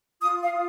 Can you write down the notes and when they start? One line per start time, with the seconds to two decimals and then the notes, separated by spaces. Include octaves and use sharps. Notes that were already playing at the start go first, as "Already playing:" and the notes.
0.21 F4 D#6
0.42 F5
0.52 F4